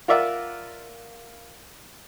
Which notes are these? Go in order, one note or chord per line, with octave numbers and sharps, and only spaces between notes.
F4 A#4 D5 E5 F#5